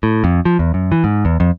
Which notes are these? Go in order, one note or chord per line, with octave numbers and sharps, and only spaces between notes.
A2
F2
F3
E2
F#2
E3
G#2
E2
F2